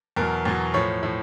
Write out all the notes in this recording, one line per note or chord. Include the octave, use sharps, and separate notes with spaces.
E2 B2 F#3 A#4
E2 B2 F#3
A2 F3 C#5
A2 F3